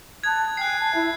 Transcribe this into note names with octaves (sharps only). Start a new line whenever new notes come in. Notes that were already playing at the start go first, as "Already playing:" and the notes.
A5 D#6 F#6 G#6
G5 G#5 F#6 C7
A5
E4 E5